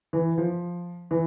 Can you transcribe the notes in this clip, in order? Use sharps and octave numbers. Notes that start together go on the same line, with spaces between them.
E3
F3
E3